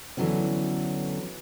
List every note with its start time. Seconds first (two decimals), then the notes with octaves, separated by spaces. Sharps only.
0.17 D3 E3 F#3 B3 C#4